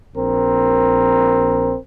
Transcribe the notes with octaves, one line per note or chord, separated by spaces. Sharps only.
A#1 C4 A#4